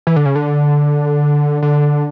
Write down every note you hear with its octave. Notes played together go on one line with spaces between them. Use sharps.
E3
D3
C#3
D3
D3